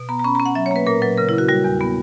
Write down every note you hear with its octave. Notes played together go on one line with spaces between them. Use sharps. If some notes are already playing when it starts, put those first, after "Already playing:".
Already playing: B2
B3 A#5
A#5
C#4 B5
C#4 A#5
F#5
F#3 E5
C#5
A#3 B4
A#2 A#4
F#3 B4
C#3 A#4
C#3 E4
F#4
G3 F#4
E2
B3